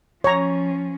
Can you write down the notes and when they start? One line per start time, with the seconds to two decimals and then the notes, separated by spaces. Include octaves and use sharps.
0.24 F3 C#4 C#5 A#5